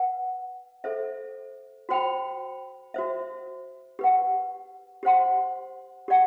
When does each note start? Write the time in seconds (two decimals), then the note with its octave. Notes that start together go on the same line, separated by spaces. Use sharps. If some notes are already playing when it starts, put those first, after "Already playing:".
Already playing: B4 F#5
0.84 A4 C5 E5
1.89 F#4 C5 G5 B5
2.94 F#4 C5 E5
3.99 G4 B4 F#5
5.03 G4 C5 F#5 C6
6.08 G4 D5 F#5